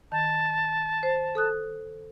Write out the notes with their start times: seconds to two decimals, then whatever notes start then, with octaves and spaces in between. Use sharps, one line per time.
0.12 D#3 A5
1.03 C5
1.35 A4 D#6 F#6